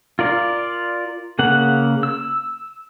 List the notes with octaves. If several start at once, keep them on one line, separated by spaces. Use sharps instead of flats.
F4 A#4 D5
C#3 A#3 F#5
E6